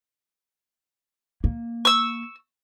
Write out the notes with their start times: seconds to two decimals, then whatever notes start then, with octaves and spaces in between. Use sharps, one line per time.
1.44 A#3
1.85 C#6 E6